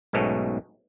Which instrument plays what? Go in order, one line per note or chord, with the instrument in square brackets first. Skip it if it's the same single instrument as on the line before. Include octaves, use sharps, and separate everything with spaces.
[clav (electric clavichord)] B1 G#2 B2 A3 C#4